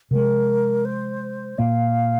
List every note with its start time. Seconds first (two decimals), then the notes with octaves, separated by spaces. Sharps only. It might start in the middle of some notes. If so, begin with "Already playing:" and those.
0.11 C3 F3 G#3 A#4
0.85 C5
1.58 A#2 A#3 F5